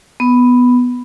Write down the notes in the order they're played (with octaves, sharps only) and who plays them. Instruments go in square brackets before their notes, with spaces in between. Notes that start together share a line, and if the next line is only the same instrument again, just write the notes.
[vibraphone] B3